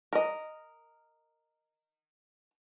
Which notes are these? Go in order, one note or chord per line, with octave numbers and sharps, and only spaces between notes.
A#4 D#5